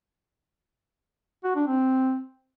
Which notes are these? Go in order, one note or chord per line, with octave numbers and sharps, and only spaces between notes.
F#4
D4
C4